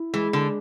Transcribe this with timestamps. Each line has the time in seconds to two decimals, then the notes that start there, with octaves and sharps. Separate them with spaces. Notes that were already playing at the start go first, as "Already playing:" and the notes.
Already playing: E4
0.14 E3 G#3
0.33 D3